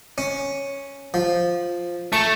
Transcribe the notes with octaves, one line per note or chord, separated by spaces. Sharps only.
C#4
F3
A3 C#6